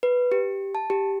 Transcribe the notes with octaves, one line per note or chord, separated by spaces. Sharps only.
B4
G4
A5
G4